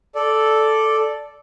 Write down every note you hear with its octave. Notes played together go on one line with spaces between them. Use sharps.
A4 D5